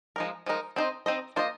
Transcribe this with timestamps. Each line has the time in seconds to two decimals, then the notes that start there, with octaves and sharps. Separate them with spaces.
0.16 F3 G#3 D#4 A#4
0.46 F3 G#3 D#4 A#4
0.76 C4 D#4 C5 D#5
1.06 C4 D#4 C5 D#5
1.36 A#3 F4 C5 D#5